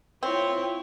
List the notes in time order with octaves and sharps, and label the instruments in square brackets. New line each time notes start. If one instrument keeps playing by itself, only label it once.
[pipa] C4 [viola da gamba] E4 F4 C#5